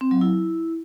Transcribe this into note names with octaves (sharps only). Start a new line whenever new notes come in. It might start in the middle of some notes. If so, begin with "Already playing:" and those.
C4
F#3
E4